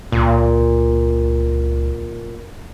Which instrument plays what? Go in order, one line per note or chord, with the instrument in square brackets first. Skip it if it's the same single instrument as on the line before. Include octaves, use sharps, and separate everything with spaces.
[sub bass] C#2 [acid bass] A#2